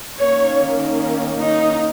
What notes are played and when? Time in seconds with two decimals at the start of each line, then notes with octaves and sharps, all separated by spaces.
0.20 D#3 A#3 C#4 C#5
1.39 D#4